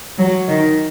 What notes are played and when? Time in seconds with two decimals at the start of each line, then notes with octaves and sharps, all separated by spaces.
0.18 F#3
0.48 D#3